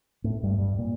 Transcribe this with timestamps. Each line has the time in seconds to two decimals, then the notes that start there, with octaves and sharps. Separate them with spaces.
0.24 A2
0.43 G2
0.58 G2
0.78 A#2